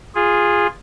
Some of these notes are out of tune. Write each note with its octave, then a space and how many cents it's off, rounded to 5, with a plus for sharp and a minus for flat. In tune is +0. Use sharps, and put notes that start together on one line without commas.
F4 +5 G#4 -10